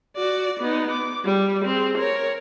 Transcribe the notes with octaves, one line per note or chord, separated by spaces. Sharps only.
F#4 D5
B3 D#4
D6
G3
C4 G#4
A#4 C#5